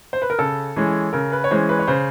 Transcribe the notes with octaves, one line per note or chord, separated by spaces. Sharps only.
C5
B4
A#4
C#3 A4
E3 G#3 C#4
C#3 A#4
B4
C#5
E3 G#3 C#4 C5
B4
C#5
C#3 C5